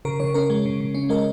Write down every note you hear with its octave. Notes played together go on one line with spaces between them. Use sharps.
C#3 A#4
C#3 C#5
C#4 A#4
G#3
C#3
C#3
C#4
G#3 A#4 D#5